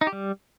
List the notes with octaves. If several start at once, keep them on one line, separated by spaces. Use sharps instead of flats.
D#4
G4
G3